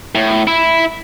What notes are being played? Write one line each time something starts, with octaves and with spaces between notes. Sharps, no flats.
A2
E4